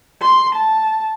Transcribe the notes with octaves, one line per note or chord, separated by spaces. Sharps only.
C6
A5